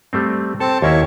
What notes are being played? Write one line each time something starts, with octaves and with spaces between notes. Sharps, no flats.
G3 A3 C4
C4 A4 A5
D#2 A#3 E4 C#5